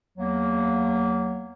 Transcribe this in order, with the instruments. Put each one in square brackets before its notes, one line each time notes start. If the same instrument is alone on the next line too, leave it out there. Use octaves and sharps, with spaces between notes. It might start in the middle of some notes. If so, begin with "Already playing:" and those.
[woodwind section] E2 F#3 A#3